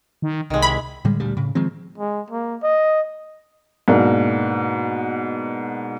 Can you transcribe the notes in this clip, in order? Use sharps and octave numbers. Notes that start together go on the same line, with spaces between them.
D#3
C2 D#3 G#3
E4 B5
A2 D3 G3 G#3
D2 A#2 G3
A2 C#3
D#3 F3 G#3 C4
G#3
A#3
D#5
G#2 B2 A#3 D4